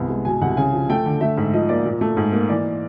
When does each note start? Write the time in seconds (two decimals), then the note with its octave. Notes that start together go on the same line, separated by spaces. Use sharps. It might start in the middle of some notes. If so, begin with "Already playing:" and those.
Already playing: C2 B3 G#5
0.09 G#3
0.25 B2 G#5
0.42 C2 F#5
0.57 C#3 G#5
0.73 F3
0.90 A3 G5
1.06 D3
1.21 A3 E5
1.37 G#2
1.53 F3 D#5
1.69 A#3 D5
1.85 A#2
2.01 A3
2.17 G#2
2.33 A#3
2.49 E3 D5